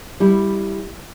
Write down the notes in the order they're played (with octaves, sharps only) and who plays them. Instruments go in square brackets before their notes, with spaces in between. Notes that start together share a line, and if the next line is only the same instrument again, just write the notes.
[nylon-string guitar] G3 E4